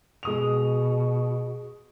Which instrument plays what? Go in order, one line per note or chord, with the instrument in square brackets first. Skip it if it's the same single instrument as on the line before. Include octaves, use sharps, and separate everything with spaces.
[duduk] B2 [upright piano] G#3 D#6 F7